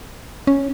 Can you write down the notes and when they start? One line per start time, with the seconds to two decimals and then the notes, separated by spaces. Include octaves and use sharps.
0.47 C#4